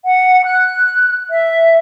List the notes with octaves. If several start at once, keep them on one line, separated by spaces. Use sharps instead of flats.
F#5
F#6
E5